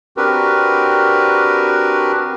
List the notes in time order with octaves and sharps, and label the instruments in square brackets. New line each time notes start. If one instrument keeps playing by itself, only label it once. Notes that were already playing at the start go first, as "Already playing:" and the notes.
[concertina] C4 D4 F#4 G4 A#4 B4